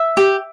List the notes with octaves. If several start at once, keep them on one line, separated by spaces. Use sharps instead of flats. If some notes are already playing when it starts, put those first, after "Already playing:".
Already playing: E5
G4